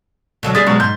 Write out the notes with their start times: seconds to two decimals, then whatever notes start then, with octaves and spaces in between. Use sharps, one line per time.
0.43 B2 D3 F#3
0.55 G3 G#3 G#4 D#6 A6 B6
0.66 B2 F#3 G#3
0.80 G#2 C6 G6